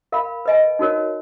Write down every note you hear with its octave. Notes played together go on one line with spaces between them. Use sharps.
A#4 F5 B5
B4 D#5 G#5
D#4 F#4 A#4 C#5